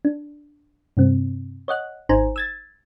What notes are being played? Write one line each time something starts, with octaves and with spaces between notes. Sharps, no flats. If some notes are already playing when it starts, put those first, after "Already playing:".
D4
G2 C3 C4
C#5 D#5 F#5 F#6
G#1 D#4 C5 G#5 A#5
E6 G#6 A6